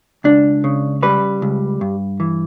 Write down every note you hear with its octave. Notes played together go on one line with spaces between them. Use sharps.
C#2 D4
C#3
G3 B4
C#2
G2
E3